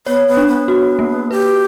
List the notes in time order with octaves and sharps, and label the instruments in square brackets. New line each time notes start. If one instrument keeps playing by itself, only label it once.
[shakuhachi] B3 [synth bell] C#5
[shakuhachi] B3
[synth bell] D4
[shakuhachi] B3
[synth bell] F#4
A#3
[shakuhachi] G4 [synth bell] B4